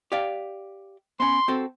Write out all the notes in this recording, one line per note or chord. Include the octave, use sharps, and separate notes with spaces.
G4 D5 F5
B3 C#4 C6
C4 F#4 A4